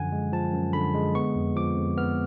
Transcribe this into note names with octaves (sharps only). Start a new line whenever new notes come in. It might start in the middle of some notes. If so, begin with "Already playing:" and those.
Already playing: F#2 D3 F3 F#5 G#5
G#3
F3 A5
F#2
D3 B5
G#3
B3 C#6
F2
F3 D6
F2
B3 F6